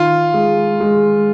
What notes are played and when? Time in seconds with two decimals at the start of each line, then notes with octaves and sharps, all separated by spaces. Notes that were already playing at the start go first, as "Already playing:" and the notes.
Already playing: D#3 F4
0.34 G#3
0.80 G#3